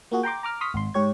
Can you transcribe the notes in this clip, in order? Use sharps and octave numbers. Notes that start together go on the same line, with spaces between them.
A#3 F4 F#4 G#4
G5 A#5 C6 D6
A#5 D6 F6
C6 C#6 D#6 F6 B6
G#1 C6
G#2 G4 C#5 G#6